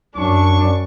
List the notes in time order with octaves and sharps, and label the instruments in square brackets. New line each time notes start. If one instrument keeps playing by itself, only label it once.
[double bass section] F#2 [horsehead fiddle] D4 [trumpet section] C#6